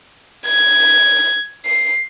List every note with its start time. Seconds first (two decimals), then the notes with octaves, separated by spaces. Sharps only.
0.47 G#6
1.66 C7